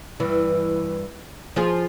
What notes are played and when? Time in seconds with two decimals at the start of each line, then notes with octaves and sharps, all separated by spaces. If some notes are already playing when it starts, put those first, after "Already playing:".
0.20 G2 E3
1.56 F3 F4 G#4